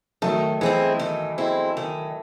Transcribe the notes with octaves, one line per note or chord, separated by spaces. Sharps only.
D#3 F#3 A3
E3 G#3 C4 E4
D#3
G#3 C4 E4
D#3